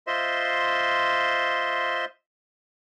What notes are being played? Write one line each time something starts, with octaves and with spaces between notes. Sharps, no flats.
F4 C5 D#5 E5 C6